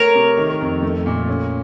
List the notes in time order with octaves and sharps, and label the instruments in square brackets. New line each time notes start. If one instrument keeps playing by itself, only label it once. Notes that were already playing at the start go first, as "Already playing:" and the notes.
Already playing: [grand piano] A3 [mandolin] A#4 C#5
[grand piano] C3
D#3
F2
A3
A#2
C#4